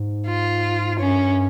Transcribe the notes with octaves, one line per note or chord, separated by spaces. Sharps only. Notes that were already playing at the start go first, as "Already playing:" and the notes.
Already playing: G#2
F4
G2 C#4